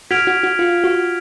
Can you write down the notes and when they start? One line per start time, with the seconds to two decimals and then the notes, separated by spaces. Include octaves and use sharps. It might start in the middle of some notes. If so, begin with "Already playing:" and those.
0.11 F#4 F6 G#6 B6 D7 F7
0.27 F#4
0.43 F#4
0.59 F4
0.84 F#4